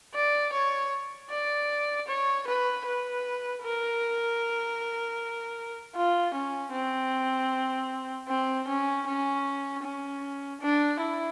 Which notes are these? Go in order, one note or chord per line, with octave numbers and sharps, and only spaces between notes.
D5
C#5
D5
C#5
B4
B4
A#4
F4
C#4
C4
C4
C#4
C#4
C#4
D4
E4